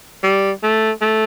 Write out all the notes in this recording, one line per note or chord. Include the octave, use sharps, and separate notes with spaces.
G3
A3
A3